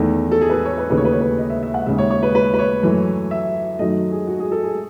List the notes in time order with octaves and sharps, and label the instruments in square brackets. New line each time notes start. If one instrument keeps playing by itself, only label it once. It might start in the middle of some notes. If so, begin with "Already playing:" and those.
Already playing: [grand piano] E2 D#3 A3
A4
G#4
B4
A4
C#5
B4
D#2 C#3 E3 A3 B4
C#5
B4
C#5
B4
D#5
E5
E5
F#5
D#2 C#3 G#3 E5
C#5
C#5
B4
B4
B4
C#5
F#2 E3 A3
E5
F#2 D#3 F#3 A3 D#5
G#4
F#4
G#4
A4
G#4